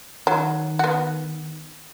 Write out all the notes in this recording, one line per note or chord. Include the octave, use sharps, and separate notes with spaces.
D#3 F#3
B3 F#4